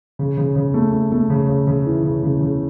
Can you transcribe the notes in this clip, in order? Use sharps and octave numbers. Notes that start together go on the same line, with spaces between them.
C#3
C#3
C#3
A3
A3
A3
C#3
C#3
C#3
E3
C#3
C#3
C#3